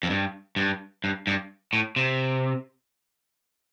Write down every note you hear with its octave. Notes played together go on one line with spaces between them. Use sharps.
F2
G2
G2
G2
G2
A2
C3